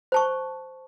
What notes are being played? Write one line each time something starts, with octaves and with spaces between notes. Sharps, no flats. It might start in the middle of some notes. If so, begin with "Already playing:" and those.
C5 A5 C#6